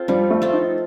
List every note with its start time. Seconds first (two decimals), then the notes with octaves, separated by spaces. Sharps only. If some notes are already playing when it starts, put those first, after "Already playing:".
Already playing: C4 F4 A4
0.08 F3 G3
0.30 A3
0.42 C4 F4 A4
0.53 D#4